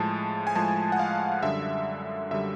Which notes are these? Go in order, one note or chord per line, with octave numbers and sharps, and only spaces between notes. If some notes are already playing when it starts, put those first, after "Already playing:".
Already playing: A2 F3 G#3 A5
G#5
A2 F3 G#3 A5
F#5
F5
F#2 D3 G3 E5
F#2 D3 G3 E5